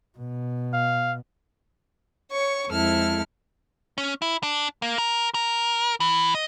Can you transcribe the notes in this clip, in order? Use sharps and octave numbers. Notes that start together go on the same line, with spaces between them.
B2
F5
C#5 C#6
F2 G#3 E4 A4 F6
C#4
E4
D4
A#3
A#4
A#4
E3
D#5